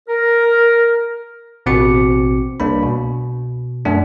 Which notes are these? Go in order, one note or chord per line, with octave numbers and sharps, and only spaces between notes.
A#4
A1 B2 C4 F#4 D6 C#7
C2 A#3 D4 B5
B2
F#2 A3 D4